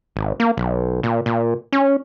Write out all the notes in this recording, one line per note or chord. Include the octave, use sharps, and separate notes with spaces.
G#1
A#3
B1
A#2
A#2
C#4